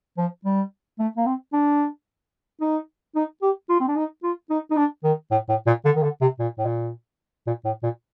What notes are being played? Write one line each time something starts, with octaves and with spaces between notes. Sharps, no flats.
F3
G3
A3
A#3
C4
D4
D#4
D#4
G4
F4
C4
D4
D#4
F4
D#4
D#4
D4
D#3
A2
A2
A#2
D3
D#3
D3
C3
A#2
A2
A#2
A#2
A2
A#2